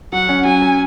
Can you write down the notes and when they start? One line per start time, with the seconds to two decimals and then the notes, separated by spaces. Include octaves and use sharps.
0.12 F#3 F#5
0.29 C#4
0.45 F#3 G#5
0.62 F#3